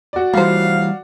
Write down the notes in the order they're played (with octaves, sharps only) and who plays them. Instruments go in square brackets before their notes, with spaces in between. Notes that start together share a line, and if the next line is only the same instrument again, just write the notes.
[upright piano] F#4 D5
[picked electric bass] E3 G3 [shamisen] F3 C5 [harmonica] F5